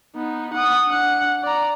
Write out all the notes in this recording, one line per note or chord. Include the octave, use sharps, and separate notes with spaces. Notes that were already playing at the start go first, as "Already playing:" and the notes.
B3 D#4
F#5 D#6
D4 F#5
D5 A#5